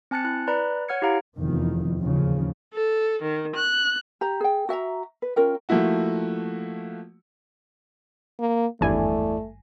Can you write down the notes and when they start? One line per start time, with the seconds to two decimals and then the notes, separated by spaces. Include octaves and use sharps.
0.11 C4 G#5 A5 F#6 A6 C#7
0.24 E4 F#6
0.47 B4 D5 A#5 B5 F#6
0.89 C#5 F#5 F6 G#6 C#7
1.02 E4 G4 F5 A#5 F6 D7
1.37 F1 E2 D#3 F3
1.98 A1 D#2 C#3 F3
2.73 A4
3.22 D#3
3.54 F#6
4.21 G4 A#5
4.40 G#4 G5
4.69 F#4 E5 G5 A#5
5.22 B4
5.36 C#4 F4 A#4 G5
5.69 F3 A3 A#3 E4 F#4
8.40 A#3
8.81 G#1 E2 G2 A3 E4 D5 G#5